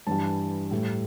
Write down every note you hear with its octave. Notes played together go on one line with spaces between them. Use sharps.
G2 E3 G3 A5
A2 G3